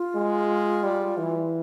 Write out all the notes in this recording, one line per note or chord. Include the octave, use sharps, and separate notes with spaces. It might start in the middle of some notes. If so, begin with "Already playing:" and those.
Already playing: F4
G#3
G3
E3